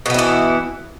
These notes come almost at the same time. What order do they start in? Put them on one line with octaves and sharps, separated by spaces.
B2 B3 E4 E3